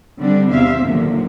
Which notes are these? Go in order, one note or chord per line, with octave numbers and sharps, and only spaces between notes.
D3 G3 C4 D4
E2 C3 C5 E5 F5
D#2 A#2 D3 F3 F#3 A#3